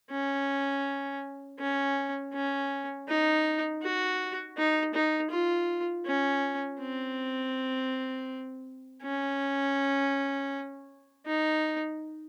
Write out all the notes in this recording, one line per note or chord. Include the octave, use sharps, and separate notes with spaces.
C#4
C#4
C#4
D#4
F#4
D#4
D#4
F4
C#4
C4
C#4
D#4